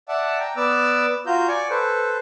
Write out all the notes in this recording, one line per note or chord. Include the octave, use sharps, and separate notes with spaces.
D5 E5 F#5 A5
G5 A#5
B3 B4 D5 D6 E6
F4 F#4 A#5 G6
D5 G#5 C#6
A4 B4 C5